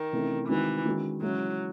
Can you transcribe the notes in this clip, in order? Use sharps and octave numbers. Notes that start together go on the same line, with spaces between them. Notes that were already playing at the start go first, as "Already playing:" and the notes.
Already playing: D#3
C3 E3 A3 C#4
D#3 E3 G#3 C4 D#4 F#4
D#3 G#3 C#4 F#4
C#3 E3 F#3 G#3 C#4 E4